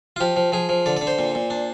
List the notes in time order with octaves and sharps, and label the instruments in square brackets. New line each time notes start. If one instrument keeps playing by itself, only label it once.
[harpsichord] F4
F3 G4
F3
F3 G#4
F3
D3 D5
D3 D5
C5
A#2
A#2
D4